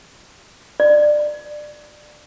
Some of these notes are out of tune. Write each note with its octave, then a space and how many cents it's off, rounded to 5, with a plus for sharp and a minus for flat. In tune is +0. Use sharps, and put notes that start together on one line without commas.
D5 +20